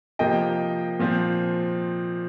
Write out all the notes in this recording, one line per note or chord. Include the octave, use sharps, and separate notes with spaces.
C3 F3 A#3 D#5 G5
A#2 F3 C4